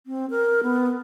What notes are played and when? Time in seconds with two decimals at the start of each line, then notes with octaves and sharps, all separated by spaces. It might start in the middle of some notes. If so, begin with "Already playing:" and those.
0.06 C4
0.30 A#4
0.63 B3